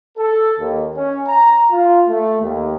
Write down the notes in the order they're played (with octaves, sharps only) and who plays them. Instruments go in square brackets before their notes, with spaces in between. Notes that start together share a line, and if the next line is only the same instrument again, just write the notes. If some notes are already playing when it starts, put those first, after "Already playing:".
[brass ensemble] A4
D#2
C#4
A#5
F4
A3
D#2